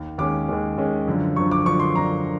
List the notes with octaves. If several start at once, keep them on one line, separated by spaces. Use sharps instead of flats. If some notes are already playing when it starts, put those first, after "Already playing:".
Already playing: D#2 D#3
D#2 D#3 G#3 C#4 D6
D#2 D#3 G#3 C#4
D#2 D#3 G#3 C#4
F#2 D3 F3
F#2 D3 F3 C#6
D6
F#2 D3 F3 C#6
C6
F#2 D3 F3 A#5